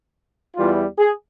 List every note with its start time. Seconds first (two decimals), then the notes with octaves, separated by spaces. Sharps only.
0.56 E2 E3 G3 F4
0.98 G#4